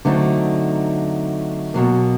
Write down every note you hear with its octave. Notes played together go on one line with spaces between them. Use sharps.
D3 F#3 A3 C4 D#4
B2 F#3 A#3